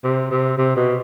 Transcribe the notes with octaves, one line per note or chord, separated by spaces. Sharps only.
C3
C3
C3
B2